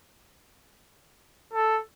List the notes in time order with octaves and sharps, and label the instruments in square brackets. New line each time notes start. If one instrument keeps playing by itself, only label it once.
[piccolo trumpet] A4